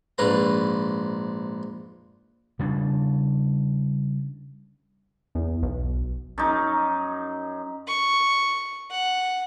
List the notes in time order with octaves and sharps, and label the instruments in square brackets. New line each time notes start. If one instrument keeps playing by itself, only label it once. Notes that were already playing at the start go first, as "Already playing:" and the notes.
[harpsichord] A#1 G#2 B4 A#5
[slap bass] C#3 G3 C#4 D4
[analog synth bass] E2
B1
[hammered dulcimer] F#2 D#4
[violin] C#6
F#5